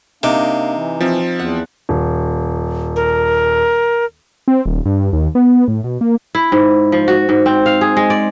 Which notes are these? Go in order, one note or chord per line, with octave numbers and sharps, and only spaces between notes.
C3 A#3 D4 D#4 D6
E3
F3 C4
E2 F#5
D#1
A#4
C4
D#1
G2
D#2
B3
A2
B2
A#3
E4
G#2
F3
F#4
G#2
C4
F5
G#4
G#3
D5